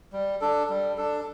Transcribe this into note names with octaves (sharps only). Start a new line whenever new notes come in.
G3
D4 A4
G3
D4 A4